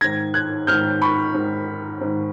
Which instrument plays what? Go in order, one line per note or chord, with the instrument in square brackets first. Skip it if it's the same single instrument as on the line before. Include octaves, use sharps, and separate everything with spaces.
[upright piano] G#2 D#3 G#6 A#6
F#6 G#6
G#2 D#3 F6 G6
B5 C#6
G#2 D#3
G#2 D#3